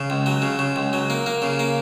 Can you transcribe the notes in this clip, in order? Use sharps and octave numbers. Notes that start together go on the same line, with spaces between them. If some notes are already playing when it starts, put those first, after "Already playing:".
Already playing: C#3
C#2
F#3
C#3
C#3
C#2
F#3
A#3
A#3
C#3
A#3